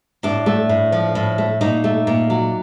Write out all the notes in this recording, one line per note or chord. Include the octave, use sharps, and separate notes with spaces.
A2 D4
A3
A2
F3
A2
A3
A#2 D#4
A3
A#2
F#3